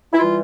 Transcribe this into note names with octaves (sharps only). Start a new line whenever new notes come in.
E4
E3 G3 F4